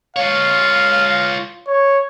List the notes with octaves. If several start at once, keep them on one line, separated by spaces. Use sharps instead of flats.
F4 C#5 F5
C#5